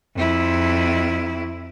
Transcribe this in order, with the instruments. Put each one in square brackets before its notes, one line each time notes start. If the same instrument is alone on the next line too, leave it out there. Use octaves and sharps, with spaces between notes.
[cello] F2 E4